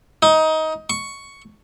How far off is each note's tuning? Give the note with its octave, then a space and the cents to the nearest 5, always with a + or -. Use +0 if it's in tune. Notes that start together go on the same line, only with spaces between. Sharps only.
D#4 +20
C#6 +5